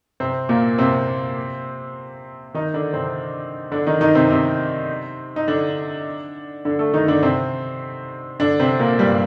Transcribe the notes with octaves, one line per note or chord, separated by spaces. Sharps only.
C3 C4
A#2 A#3
C3 C4
D#3 D#4
D3 D4
C3 C4
D3 D4
D#3 D#4
D#3 D#4
C3 C4
C3 C4
D#4
D3 D4
D3 D4
A3 A4
D#3 D#4
D3 D4
C3 C4
D3 D4
C3 C4
A#2 A#3
G2 G3